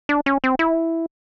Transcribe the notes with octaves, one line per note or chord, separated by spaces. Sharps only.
D4
C#4
C4
E4